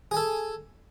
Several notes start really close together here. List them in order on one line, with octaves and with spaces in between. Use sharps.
G#4 G#5 A4